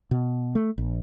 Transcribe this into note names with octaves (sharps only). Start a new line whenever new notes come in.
B2
A3
A#1